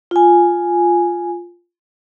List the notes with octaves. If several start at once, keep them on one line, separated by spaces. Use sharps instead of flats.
F4 G#5